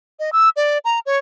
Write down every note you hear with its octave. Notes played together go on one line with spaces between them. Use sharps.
D#5
E6
D5
A#5
C#5